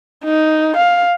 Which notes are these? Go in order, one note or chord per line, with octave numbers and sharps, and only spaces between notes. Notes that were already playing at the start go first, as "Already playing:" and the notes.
D#4
F5